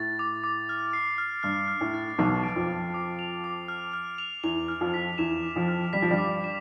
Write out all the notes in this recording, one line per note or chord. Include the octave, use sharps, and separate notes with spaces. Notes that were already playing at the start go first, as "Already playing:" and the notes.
Already playing: A2 A6
D6
D6
F6
C7
F6
G2 F6
F6
A2
A6
B1 B2 D6
D7
F2 F3
D6
D6
F7
D6
F6
F6
F7
E2 E3 F7
F6
F2 F3
B6
E2 E3 E7
D6
F2 F3
F6
G3 B6
F3
G2 G3
D6
E7